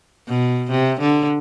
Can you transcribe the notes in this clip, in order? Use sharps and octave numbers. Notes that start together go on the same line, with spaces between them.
B2
C3
D3